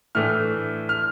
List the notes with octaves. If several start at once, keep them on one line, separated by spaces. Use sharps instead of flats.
A2 E3 A3 D4 F6
F6